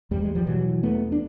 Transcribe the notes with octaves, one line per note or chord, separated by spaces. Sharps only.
E2 G3
G#3
F3 G3
B2 E3 F#3
E2 A3 B3
D4